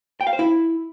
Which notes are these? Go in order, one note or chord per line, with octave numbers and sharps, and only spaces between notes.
G5
F5
C5
E4